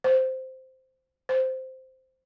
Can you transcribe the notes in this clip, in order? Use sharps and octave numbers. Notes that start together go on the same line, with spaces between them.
C5
C5